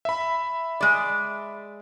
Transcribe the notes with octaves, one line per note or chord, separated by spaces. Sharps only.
E5 B5
G#3 D5